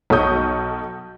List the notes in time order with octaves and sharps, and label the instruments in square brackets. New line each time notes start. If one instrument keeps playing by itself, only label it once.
[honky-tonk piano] B1 F#3 A4 C#6 D#6 G6